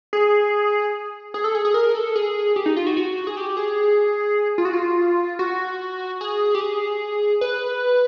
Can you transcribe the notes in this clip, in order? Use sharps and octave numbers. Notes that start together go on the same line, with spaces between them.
G#4
G#4
A4
G#4
G#4
A#4
A4
G#4
G4
D#4
F4
F#4
F#4
G#4
G4
G#4
F4
F#4
F4
F#4
G#4
G4
G#4
B4